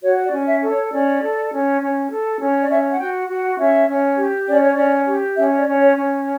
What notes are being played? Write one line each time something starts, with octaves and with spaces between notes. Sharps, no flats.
F#4 C#5
D5
C#4
E5
A4
C#5
C#4 D5
A4
C#4
C#4
A4
C#4
D5
C#4 E5
F#5
F#4 G5
F#4 F#5
C#4 E5
C#4
G4
C#4 D5
C#5
C#4 D5
G4
C#4 E5
D5
C#4
C#5
C#4